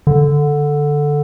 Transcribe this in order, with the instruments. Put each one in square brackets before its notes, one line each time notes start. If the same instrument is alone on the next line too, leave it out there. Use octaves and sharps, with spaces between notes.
[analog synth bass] D3